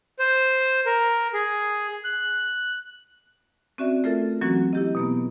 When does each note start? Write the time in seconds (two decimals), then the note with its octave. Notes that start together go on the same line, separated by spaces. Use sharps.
0.19 C5
0.86 A#4
1.33 G#4
2.04 F#6
3.78 C4 C#4 F#4 D5 E5
4.04 A3 F4 A4 A#4 E5 A6
4.41 E3 F#3 A#3 C4 C#4 F#4
4.73 E4 G4 D#5
4.95 B2 A#3 B3